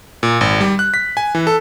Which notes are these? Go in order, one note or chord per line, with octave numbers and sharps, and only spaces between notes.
A#2
G#1
G3
F#6
B6
G#5
E3
A4